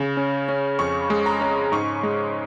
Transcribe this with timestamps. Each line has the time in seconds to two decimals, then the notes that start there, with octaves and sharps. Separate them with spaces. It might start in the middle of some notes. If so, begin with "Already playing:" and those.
Already playing: C#3
0.17 C#4
0.49 C#4
0.79 F2 C#6
1.10 G#3
1.26 A#5
1.41 C#4
1.72 G#2 C#6
2.03 G#3